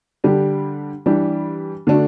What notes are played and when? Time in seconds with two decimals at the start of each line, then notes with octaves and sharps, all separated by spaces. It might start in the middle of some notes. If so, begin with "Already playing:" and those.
0.24 D3 G3 D4 G4
1.06 E3 G3 D4 G4
1.87 D3 A3 D4 F#4